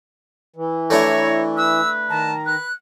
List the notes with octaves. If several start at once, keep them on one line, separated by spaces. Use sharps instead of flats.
E3
A3 D4 E4 C#5 A#5
B4 E6
D#3 A5 A#5
B4 F#6